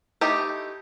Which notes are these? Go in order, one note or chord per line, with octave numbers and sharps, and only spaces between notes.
A3 D#4 E4 G4